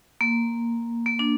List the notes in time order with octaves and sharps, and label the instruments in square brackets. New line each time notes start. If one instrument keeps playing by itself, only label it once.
[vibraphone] A#3
A#3
D4